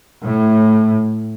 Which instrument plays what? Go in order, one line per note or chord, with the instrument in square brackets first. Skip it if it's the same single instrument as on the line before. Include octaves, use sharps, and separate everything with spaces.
[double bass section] A2